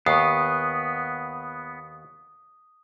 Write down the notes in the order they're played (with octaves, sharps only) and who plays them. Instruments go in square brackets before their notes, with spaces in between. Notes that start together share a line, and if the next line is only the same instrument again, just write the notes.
[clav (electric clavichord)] D#2 [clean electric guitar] B3 [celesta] C#6 C7 [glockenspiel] D#6